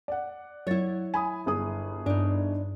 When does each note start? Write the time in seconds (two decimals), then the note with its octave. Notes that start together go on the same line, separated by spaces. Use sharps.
0.08 D5 F#5
0.67 F#3 E4 C#5 A6
1.14 G#5 B5 D#6
1.46 G1 G#4 D#6
2.06 G2 D4 D#4